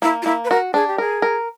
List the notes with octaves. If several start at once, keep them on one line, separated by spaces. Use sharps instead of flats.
A#3 E4
F4
A#3 E4
B4
F#4 A#4
D4 G#4
G4
G#4 A#4
A#4